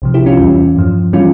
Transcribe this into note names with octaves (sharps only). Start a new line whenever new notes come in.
C2 C3 F3
E4 G4
C#4 F4
E2 E3 G3
G2 F3
E3 G3 C#4 F4